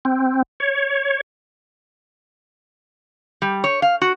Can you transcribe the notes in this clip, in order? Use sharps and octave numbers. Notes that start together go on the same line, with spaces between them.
C4
C#5
G3
C#5
F5
F#4